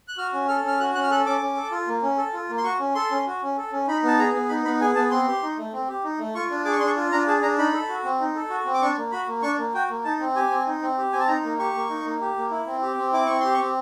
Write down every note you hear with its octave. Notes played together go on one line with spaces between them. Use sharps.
F#6
F#4 F6
C#4
A4 F6
C#4 F6
F#4 F#6
C#4 F#6
F6
A4 F#6
C#4 D6
C#4
A4
F4
A#3
C#4
A4
F4
A#3
C6
F#4 C#6
C#4
A4 C6
C#4
F#4
C#4
A4
C#4
D#4 B5
B3 A5
G#4 A#5
B3
D#4 B5
B3 B5
G#4 G#5
B3 A5
C4 C6
G4
D#4
A3
C4
G4
D#4
A3
F4 C#6
D4
G#4 D6
C#6
D4 C6
C#6
F4
D4 A#5
G#4 A5
D4 A#5
D#4 B5
A4
F#4
C4
D#4
A4
F#4
C4
D6
D4 C#6
A#3
F#4 B5
A#3
D4 C#6
A#3
F#4 G5
A#3
D#4 A5
C4
G4 G#5
C4
D#4
C4
G4
C4 G#5
A5
D#4 A#5
A#3
G4 C#6
A#3
D#4
A#3
G4
A#3
E4
C4
G4
C4
E4 D6
C4 C#6
G4 C6
C#6
C4